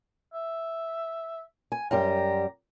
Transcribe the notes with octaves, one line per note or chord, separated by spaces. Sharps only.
E5
G#5
F#2 G3 G4 A#5